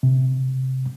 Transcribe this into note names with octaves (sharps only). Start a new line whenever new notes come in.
C3